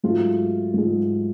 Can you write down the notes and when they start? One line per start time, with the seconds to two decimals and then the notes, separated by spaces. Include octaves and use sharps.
0.03 G#2 F#3 A3 F4 G#4
0.74 G#2 F#3 A3 F4 G#4